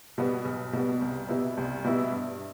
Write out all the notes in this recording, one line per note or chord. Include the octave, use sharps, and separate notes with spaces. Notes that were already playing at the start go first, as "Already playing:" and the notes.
B2 G3 B3
B1
B2 G3 B3
C2
B2 G3 B3 E4
C2
B2 G3 B3 E4
G2